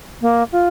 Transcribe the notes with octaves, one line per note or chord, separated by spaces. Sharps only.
A#3
F4